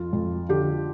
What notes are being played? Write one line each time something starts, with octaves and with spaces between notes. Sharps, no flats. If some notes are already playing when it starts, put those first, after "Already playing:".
Already playing: F2 F4
F2
D3 G4